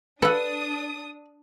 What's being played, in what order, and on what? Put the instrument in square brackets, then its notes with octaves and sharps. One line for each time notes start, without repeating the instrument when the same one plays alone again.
[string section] D4 D#6 [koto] A4 F#5 [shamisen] B4